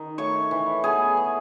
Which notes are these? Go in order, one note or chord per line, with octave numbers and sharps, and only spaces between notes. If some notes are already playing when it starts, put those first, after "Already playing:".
Already playing: D#3 D#4
A3 C#5 C#6
E3
B3 G#4 G#5
B3